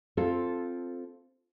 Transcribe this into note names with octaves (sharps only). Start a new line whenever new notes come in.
C4 F4 A4